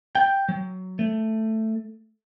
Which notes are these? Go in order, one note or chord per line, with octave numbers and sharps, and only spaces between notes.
G5
F#3
A3